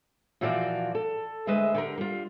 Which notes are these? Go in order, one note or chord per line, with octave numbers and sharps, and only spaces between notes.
A#2 E3 F3 F4 F#4 D5
A4
D2 G#3 B4 D#5 E5
D3 G4 A#4
G3 F4